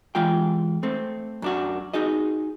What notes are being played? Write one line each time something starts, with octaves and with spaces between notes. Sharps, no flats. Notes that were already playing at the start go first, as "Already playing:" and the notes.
E3 G#3 F4 G5
A3 C4
F#2 D4 F#4
D#4 F#4 G#4 D#5